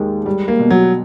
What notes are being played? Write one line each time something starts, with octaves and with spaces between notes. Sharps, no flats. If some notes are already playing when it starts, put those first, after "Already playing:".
Already playing: D#2 D#3 G#3
G3
A#3
B2
F#3